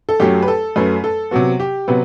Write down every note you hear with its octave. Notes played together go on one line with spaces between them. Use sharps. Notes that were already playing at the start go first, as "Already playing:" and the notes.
A4
F#2 F#3 A3 G4
B4
A4
F#2 F#3 A3 B4
A4
C3 F#3 B3 F#4
G4
C3 F#3 B3 B4